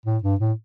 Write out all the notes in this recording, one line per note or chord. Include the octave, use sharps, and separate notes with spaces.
A2
G2
A2